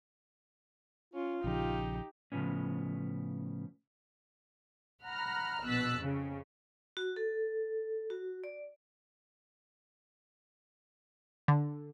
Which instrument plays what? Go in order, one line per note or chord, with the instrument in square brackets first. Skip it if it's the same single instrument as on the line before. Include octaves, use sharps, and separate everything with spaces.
[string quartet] C#4 [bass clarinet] F4
[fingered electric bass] A#1 C#3 F3 [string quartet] D#4 G4
[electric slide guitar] A2 C#3 E3 F3 B3 C#4
[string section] F#5 A#5 B5 F6
A#1 B2 E6 F#6 A6 B6
F2 C#3
[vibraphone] F#4
A4
F#4
D5
[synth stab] D3